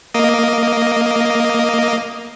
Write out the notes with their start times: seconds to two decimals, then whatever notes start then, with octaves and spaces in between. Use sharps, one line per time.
0.14 A#3 D#5